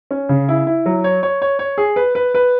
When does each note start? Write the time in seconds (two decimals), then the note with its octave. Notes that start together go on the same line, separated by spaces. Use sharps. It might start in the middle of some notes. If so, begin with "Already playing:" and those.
0.11 C#4
0.29 C#3
0.49 E4
0.67 E4
0.86 F#3
1.04 C#5
1.23 C#5
1.42 C#5
1.59 C#5
1.78 G#4
1.96 B4
2.15 B4
2.34 B4